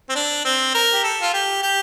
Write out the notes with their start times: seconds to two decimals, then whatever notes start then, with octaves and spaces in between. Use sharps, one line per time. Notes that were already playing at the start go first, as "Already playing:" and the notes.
0.09 C4
0.15 D4
0.45 C4
0.74 A#4
0.93 G4
1.04 A4
1.22 F4
1.34 G4
1.62 G4